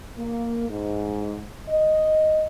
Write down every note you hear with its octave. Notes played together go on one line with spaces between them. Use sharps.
A#3
G#2
D#5